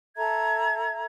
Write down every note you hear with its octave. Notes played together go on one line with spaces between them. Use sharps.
A4 E5 A#5 G#6